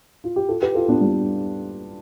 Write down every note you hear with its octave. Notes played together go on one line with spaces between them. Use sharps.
F4
G4
F4 A4
G4 B4
F4 A4
B3 D4
G3 B3